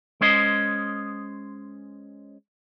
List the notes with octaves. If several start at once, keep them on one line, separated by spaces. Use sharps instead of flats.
G#3 C#4 C5 D#5